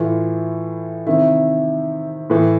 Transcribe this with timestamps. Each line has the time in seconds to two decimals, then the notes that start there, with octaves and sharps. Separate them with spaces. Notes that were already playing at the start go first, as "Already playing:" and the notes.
Already playing: A2 E3 F4
1.07 C3 D#3 E4
2.30 A2 E3